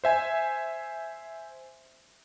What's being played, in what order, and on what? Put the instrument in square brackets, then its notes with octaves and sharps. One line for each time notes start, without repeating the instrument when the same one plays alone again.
[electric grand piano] C5 E5 G#5